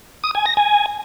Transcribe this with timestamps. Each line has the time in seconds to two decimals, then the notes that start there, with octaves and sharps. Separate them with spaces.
0.24 D#6
0.35 G#5
0.46 A#6
0.57 G#5